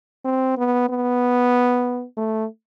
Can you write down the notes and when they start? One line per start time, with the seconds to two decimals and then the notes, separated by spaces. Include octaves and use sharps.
0.25 C4
0.57 B3
0.89 B3
2.17 A3